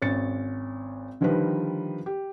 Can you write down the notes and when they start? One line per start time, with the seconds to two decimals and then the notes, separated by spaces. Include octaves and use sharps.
0.02 G#1 C#4 A6 C#7
1.21 D3 D#3 F3 G3 D#4 B4
2.06 G4